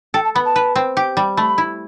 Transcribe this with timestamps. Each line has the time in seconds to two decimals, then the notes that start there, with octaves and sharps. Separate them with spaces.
0.14 A4 G5
0.25 A5
0.35 B3 B5
0.45 A5
0.56 B4
0.75 C4
0.97 G4
1.17 G3
1.37 A3 B5
1.58 E4